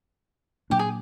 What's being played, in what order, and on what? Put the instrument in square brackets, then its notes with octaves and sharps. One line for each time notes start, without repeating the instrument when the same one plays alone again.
[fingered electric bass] A#2 F#3 A#3 D4 [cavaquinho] G4
[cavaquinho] G#4